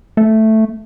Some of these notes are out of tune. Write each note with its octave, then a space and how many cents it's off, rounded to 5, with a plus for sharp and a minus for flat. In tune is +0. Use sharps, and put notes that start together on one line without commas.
A3 +0